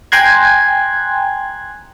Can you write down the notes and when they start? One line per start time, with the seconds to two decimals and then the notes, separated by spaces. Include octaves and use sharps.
0.12 G5 G#5 A#5 C6 F#6 G#6